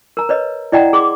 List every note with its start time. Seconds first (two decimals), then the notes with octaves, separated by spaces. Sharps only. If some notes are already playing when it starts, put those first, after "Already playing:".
0.17 A#4 A#5
0.29 B4 C#5 D#5
0.72 E4 D5 D#5 F#5 G5 A#5
0.93 G#4 C6 D6